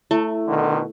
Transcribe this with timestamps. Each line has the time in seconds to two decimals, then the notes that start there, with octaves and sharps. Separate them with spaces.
0.11 A3 E4
0.48 B2 D3 D#3